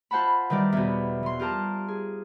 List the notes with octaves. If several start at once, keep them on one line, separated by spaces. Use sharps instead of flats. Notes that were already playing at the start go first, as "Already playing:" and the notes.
F4 C5 F#5 A5 B5
D#3 E3 G3 A#4 D5
E2 B2
E3 C6
F4 G4 A#4 A5 A#5
G#4